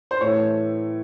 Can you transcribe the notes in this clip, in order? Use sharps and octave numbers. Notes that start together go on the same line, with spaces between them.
C5
A2 E3 A3 C#5